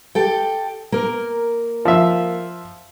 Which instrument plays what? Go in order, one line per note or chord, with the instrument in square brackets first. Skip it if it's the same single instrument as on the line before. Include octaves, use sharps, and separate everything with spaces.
[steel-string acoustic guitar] G4 A4 G5
A#3 A#4
[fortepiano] F3 E5